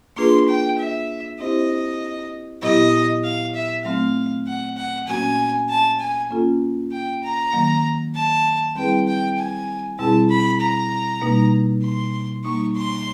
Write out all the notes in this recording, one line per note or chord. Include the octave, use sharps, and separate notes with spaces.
A#3 D4 F4 G#4 B4 C6
G5
E5
C4 E4 G4 C5 D#5
A#2 F#3 B3 E4 G4 D#5
F5
E5
F#3 A3 C4 F5
F#5
F#5
A#2 F#3 A#3 C#4 F#4 G#5
A5
G#5
A#3 C#4 F4 A4
G5
A#5
D#3 F#3 A#3
A5
G3 C4 E4 G#4 B4 G5
G5
G#5
B2 G3 C4 E4 G#4 A5
B5
A#5
B2 G3 A#3 D#4
C6
G3 A#3 D#4 C#6
C6